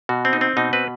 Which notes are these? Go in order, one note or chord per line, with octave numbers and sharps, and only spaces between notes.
B2 F#4
C4
D#4
C4
B2 D#4
C4 B4